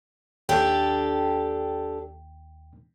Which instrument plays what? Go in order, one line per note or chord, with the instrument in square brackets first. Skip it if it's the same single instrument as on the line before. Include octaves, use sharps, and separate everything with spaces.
[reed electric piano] D#2 G5 [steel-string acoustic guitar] D4 G4 A4